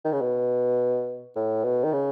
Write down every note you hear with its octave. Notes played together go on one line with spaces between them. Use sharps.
D#3
C#3
B2
A2
B2
D#3
C#3